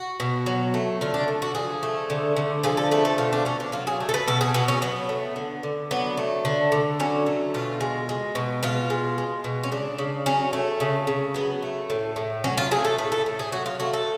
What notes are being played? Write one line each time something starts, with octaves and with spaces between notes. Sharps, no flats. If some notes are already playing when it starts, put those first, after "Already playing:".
Already playing: F#4
B2
F#3
A3
D3 F4
D4
D3
F#4
F3 G#4
A3
D3
D3
F3 G#4
A4
A3 B4
A4
B2 F4
D4
B2 C#4
D4
F#3 F4
G#4
A3
A4
B4
B2 A4
G#4
B2 B3
C#4
F#3 B3
A3
D3
D3
F#3 B3
A3
D3
D3
F#3 C#4
A3
B2 F4
G#3
G#3
B2
B2 F4
G#3
G#3
B2
C#4
C#3 D4
C#3
F#3 C#4
A3
C#3
C#3
F#3 B3
A3
A2
A2
F#3 C#4
F4
A3 G#4
A4
A2 B4
A4
A2
G#4
F#3 F#4
F4
A3 F#4
A4